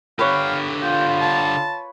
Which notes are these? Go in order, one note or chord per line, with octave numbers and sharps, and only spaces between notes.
D3 G4 B4 C#5 F5
F4 G5
A5